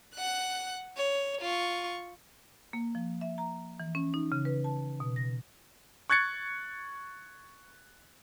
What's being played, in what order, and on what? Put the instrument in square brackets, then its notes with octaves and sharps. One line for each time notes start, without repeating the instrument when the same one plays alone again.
[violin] F#5 F#6
C#5
F4 C#6
[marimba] A#3
F3
E5
A#5
E3
C#4
D#4
C#3
B4
A5
B2
A#6
[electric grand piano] C#6 F#6 G#6 A6 C#7